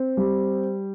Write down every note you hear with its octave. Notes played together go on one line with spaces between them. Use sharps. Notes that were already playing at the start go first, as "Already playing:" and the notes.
Already playing: C4
G3